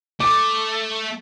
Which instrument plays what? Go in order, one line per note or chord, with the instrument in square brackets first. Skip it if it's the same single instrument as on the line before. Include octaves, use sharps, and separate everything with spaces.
[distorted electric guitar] A3 [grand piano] D6